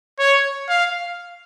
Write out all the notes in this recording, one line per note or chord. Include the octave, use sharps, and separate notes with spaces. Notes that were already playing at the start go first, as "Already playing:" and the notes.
C#5
F5